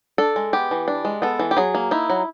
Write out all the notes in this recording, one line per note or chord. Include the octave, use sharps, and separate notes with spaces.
D4 A4
G#3
B3 G4
E3
D4
G#3
B3 A4
E3
G4
F#3 G#4
A#3
D#4 E4
F#3